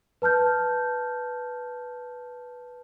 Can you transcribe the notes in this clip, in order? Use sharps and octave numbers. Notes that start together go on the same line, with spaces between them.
B4 A5 F6 G6